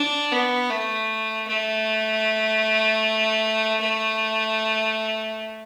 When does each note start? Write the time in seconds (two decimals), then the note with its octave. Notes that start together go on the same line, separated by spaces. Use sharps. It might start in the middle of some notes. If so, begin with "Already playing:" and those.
Already playing: D4
0.32 B3
0.70 A3
1.48 A3
3.81 A3